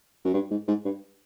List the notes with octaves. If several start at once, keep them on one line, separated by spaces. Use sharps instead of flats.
F#2
G2
G#2
G#2
G2